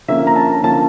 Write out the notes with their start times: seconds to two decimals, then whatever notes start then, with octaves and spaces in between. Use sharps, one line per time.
0.08 D3 F3 A#3 C#4 E5
0.27 A#5
0.36 A5
0.63 D3 F3 A#3 C#4 A5